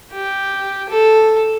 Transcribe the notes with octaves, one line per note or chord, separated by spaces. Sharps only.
G4
A4